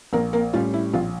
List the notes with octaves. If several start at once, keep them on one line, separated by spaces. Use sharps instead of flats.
A#1 A#3 A#4
A#3 A#4
A2 G3 C#4 F4
E4
A#1 F4